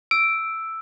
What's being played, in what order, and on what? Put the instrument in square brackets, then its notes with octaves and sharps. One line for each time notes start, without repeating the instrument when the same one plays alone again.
[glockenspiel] E6 [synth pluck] D7